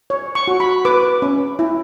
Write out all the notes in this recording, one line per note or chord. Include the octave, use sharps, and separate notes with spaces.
C#5
C#6
F#4
B5
B4 D6
C#4
E4